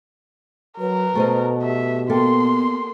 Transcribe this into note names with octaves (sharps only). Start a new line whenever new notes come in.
F#3 A#4 B4
B2 A3 C5 D#5
G4 E5
A#3 B3 G4 A4 C6